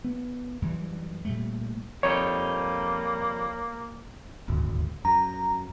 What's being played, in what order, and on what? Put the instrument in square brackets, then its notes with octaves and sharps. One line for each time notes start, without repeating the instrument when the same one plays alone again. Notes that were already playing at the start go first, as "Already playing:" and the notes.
[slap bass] B3
F#2 E3 G3
A#2 G3 A3
[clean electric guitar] F2 G3 D#4 [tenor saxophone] A#3 [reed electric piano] C#5
[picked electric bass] D#1 G#1 D2
[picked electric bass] F#2 [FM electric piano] A#5